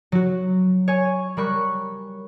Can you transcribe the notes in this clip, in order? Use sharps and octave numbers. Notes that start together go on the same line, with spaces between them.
F#3 F#4
C#5 G#5
G3 A#4 B5 C#6 F#6 C#7